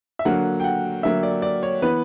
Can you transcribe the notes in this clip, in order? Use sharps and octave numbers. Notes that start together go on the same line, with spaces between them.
E5
D3 F#3 A#3 F#5
G5
F#5
D3 F#3 A#3 E5
D5
D5
C#5
E3 B3 B4